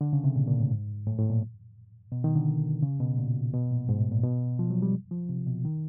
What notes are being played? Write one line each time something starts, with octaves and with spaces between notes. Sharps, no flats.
D3
C#3
C3
A#2
A#2
A2
G#2
A2
A2
A#2
B2
D#3
D3
C#3
B2
A#2
B2
A#2
G#2
A2
A#2
B2
F3
F#3
G3
F3
C3
B2
D#3